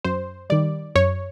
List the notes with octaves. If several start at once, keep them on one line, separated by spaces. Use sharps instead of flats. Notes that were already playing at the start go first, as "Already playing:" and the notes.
F#2 C5
D#3 G3 D5
F#2 C#5